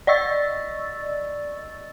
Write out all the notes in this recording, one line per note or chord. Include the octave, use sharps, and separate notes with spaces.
D5 D#5 C#6 E6 A6